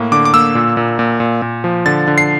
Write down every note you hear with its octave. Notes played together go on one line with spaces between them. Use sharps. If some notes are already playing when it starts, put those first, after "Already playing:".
Already playing: A2 A#3
D3 D6
D6
A#3 E6
A#2
A#2
A#2
A#2
A#2
F3
D3 A6
D3
C7